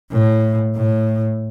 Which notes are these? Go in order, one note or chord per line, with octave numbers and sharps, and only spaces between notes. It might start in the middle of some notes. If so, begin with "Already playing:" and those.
A2
A2